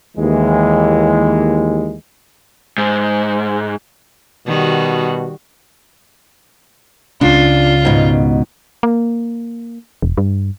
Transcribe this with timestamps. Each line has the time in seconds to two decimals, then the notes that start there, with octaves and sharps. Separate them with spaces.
0.17 D#2 E3 G#3
2.78 G#2
4.47 B2 D#3 G3 F#4
7.21 C#2 C#3 D4 F4
7.85 G#2 B2
8.83 A#3
10.02 E1
10.17 G2